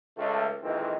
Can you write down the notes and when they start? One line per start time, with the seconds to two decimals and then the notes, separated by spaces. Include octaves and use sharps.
0.17 C#2 A3
0.62 A#1 F2 D#3 E3 G#3 C4